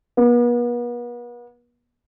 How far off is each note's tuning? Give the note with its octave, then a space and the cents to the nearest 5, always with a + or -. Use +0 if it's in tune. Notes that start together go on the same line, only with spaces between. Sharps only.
B3 -40